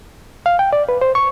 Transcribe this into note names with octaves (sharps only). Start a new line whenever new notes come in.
F5
G5
D5
B4
C5
C#6